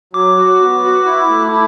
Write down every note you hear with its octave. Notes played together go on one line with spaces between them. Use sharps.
F#3 D6
F#4
B3
F#4
E4
A3
E4